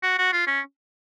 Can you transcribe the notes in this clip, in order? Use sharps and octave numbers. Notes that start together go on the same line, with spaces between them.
F#4
F#4
F4
C#4